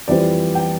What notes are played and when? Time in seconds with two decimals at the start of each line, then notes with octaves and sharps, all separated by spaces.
0.08 F2 E3 G3 C4 E4 D5
0.55 G5